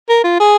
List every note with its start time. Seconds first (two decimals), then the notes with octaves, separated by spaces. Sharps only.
0.09 A#4
0.24 F4
0.40 G#4